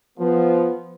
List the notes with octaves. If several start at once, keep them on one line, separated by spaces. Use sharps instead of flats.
F3 B3